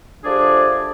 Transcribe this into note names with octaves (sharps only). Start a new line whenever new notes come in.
F3 A3 D4 G4 G#4 D5